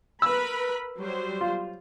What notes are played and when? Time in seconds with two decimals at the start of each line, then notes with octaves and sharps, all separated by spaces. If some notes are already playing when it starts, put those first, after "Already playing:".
0.22 A#4 B4 B5 E6
0.97 F#3 G3 C5
1.41 F4